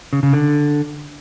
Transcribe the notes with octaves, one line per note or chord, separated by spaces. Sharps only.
C#3
C#3
D3